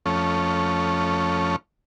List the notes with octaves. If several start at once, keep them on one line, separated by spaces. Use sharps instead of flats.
F2 A3 C#4